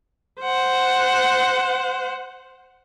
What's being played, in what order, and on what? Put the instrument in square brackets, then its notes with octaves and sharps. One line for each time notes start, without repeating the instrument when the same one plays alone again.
[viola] C5 F#5